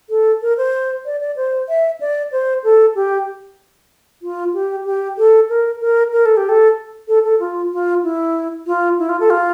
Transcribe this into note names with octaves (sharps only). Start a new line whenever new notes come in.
A4
A#4
C5
D5
D5
C5
E5
D5
C5
A4
G4
F4
G4
G4
A4
A#4
A#4
A#4
A4
G4
A4
A4
A4
F4
F4
E4
F4
E4
F4
A4
F4